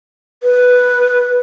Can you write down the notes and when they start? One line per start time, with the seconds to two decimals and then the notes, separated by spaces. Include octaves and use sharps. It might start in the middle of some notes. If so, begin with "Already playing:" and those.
0.43 B4